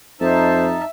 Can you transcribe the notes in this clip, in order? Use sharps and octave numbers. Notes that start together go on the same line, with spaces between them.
F2 D#4 C5 E5 A5